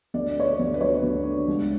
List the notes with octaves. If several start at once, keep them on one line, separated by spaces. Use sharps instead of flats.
D2 D5
D3 C#5
D5
D2
B4
F#3 C#5
D2
D3
C#2